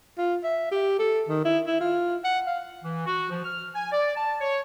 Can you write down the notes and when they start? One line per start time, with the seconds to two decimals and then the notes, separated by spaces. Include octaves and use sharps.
0.18 F4
0.43 E5
0.71 G4
0.98 A4
1.28 D#3
1.45 E4
1.67 E4
1.80 F4
2.24 F#5
2.47 F5
2.84 E3
3.06 F#4
3.30 F3
3.45 F6
3.75 G#5
3.92 D5
4.15 A5
4.41 C#5